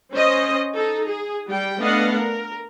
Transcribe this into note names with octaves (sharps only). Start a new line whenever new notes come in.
C#4 C5 D#5
D#4 A4
G#4
G3 G5
A3 B3 D4 D#5 F5 F#5
A#4